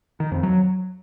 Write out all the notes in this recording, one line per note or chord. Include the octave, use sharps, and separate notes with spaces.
D#3
F2
F#3